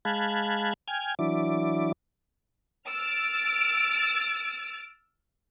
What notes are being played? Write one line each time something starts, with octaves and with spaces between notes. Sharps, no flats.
G#3 F5 A5 B5 F#6 G#6
G5 G#5 F6 G#6
E3 F#3 D4 E4 D6
E6 F6 A6 D7